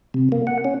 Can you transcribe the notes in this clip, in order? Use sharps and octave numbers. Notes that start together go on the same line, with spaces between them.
C3
A#3
F#5
C#4